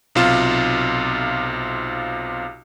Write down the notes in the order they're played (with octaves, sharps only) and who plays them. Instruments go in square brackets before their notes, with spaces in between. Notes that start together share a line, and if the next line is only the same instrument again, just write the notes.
[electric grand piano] B1 C3 F4 E7